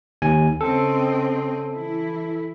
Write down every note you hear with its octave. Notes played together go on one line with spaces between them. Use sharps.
D#2 G#5
C#3 C4 A4 D#5
E3 E4